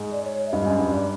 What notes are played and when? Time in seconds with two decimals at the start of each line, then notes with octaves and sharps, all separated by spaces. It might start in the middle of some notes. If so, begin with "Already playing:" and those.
Already playing: G#2
0.12 D5
0.25 C#5
0.47 E5
0.52 G2 D#5
0.66 F#2
0.79 G2
0.92 D5